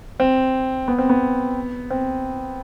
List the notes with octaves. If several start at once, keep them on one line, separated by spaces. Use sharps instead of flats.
C4
B3
C4
B3
C4